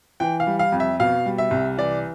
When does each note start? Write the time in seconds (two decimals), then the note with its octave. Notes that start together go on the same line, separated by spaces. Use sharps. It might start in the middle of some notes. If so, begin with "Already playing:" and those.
0.20 E3 G5
0.40 F5
0.47 G3
0.59 F5
0.72 F2
0.80 E5
1.00 B2 F5
1.26 G3
1.38 E5
1.51 C2
1.77 E3 D5